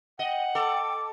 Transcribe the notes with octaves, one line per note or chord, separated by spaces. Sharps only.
D#5 F#5 G5
A4 D6